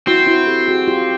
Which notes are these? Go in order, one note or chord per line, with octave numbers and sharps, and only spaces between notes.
C4 E4 F#4
E4 F#4
G4 A4
F#4 G#4
F4 G4